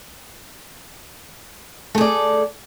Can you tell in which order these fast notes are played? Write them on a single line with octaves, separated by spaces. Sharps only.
A3 G#4 D5 A4